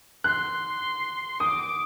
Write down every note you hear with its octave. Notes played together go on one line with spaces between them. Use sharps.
C6 F#6
D6 D#6